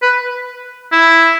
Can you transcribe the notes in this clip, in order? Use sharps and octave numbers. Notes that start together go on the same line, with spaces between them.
B4
E4